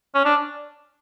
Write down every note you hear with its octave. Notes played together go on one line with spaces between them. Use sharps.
C#4
D4